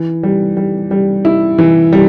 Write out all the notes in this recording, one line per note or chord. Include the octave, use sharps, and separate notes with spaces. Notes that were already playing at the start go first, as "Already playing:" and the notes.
Already playing: E3
G3
G3
G3
E4
E3
G3